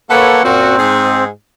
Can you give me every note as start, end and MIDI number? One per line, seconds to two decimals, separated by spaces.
0.10 0.43 58
0.10 0.41 69
0.10 0.41 71
0.10 0.41 73
0.10 0.43 78
0.44 0.78 42
0.44 0.78 46
0.44 1.24 60
0.44 0.78 66
0.79 1.26 44
0.79 1.26 68